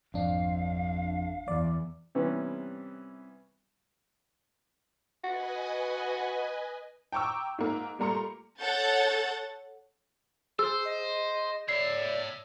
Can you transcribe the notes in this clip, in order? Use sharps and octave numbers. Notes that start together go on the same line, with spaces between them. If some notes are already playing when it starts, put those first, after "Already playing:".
G#1 F2 D4 F5
E2 D5
C3 E3 G3 B3 C#4
F#4 B4 D#5 G#5
G5 A#5 C#6 D6 E6
G#2 A#3
G3 A3 A#3 A#5 C6 C#7
A4 C#5 F#5 G6 A6
G#4 C5 E6
D#5
C#5 D5 E5 C7